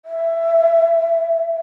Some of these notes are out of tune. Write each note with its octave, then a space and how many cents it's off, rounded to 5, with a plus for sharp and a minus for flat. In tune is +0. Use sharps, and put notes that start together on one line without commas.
E5 +10